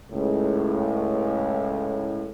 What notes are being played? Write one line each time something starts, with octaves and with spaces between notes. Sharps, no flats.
C#2 A2